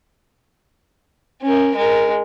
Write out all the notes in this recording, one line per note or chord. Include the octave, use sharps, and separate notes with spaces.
C#4 A#4
G#3 A#4